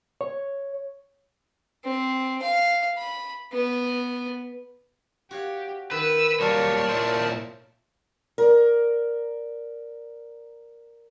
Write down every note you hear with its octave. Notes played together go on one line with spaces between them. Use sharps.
C#5
C4
F5
B5
B3
F#4 G4 C#5 F5
D#3 B4 E6
F#3 G3 A#3 F4 A#4 C#5 D5 A5
A#2 E4 C5
A#4 D5